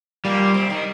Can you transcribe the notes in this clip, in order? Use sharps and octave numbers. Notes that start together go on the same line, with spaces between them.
A#2 G3 A#3
C3 C4
D#3 D#4